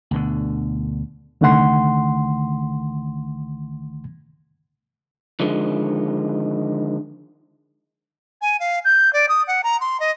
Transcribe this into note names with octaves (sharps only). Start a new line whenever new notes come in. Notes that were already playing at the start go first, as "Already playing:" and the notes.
D2 B2 D3
C2 D3 D#3 A3 F#5 C6
D3 D#3 F3 G#3
G#5
F5
G6
D5
D#6
F#5
A#5
C6
D#5